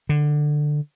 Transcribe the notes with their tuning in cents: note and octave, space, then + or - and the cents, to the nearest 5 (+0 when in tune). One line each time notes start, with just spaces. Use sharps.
D3 +15